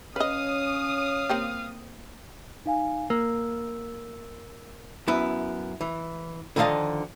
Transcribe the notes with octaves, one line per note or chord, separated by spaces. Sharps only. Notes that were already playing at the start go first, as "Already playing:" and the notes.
C#4 B4 C#5 D#5 F5 D#6
A#3 C4 G4
D#4 F5 G#5
A#3 E6
F#2 B3 E4
E3
D3 D#3 F3 D#5 F5 A5